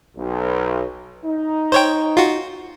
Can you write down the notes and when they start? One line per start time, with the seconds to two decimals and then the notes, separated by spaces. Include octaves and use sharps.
0.17 B1
1.26 D#4
1.72 C5 C#5 G5
2.17 F4 F#4